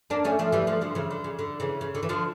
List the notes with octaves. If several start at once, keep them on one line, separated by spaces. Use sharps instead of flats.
A#3 D4
A3 C#4
F3 A3
E3 G3
F3 A3
D3 F3
C#3 E3
D3
C#3
D3
C#3 E3
C#3
D3
E3
D3 F3